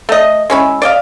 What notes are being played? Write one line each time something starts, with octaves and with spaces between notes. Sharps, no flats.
A3 D#5
G#3 C#4 E4
D5 D#5 F5